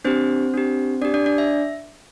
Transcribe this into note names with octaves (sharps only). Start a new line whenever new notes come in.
C4 D4 G4 C5
D4 G4
D4 G4 D5
D4 D5
D4 D5
E5